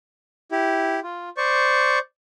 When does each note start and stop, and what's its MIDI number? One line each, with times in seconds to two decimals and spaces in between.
0.52 1.00 64
0.52 1.00 67
1.03 1.29 65
1.37 1.99 72
1.37 1.99 74
1.37 1.99 85